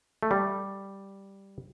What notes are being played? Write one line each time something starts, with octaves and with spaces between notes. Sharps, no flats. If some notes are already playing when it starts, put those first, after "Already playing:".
A3
G3